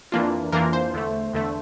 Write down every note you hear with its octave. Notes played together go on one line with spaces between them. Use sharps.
F2 E3 A#3 D4 F4
F2 E3 A#3 D4 F4 A#4
C5
E2 D3 A3
E2 D3 A3